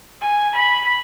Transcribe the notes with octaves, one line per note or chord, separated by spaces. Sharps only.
G#5
B5